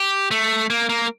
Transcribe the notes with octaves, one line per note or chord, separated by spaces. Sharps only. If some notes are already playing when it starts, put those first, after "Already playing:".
Already playing: G4
A3
A#3
A#3